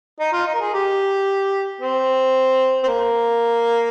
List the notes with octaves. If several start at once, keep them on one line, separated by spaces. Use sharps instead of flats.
D#4
F4
D#4
A#4
G#4
G4
C4
C4
A#3